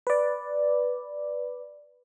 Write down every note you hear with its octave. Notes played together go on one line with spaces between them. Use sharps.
B4 D5